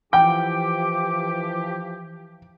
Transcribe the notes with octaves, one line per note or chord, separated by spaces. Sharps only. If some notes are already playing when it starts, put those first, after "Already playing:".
E3 F3 G4 G5 D6